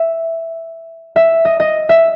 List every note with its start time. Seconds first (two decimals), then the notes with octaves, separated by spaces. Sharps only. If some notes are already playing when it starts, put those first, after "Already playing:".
Already playing: E5
1.16 E5
1.45 D#5
1.60 D#5
1.89 E5